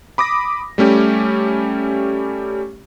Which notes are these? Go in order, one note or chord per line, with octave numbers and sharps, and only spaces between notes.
B5 D6 D#6 A#6
G3 A3 C#4 G4